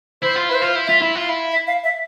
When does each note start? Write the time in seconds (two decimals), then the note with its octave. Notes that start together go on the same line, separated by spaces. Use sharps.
0.22 E4 C5
0.36 F4
0.49 E4 B4
0.55 C5
0.62 F4
0.75 E4
0.87 F4 E5
1.02 E4
1.15 F4 F5
1.29 E4
1.52 E5
1.67 F5
1.84 E5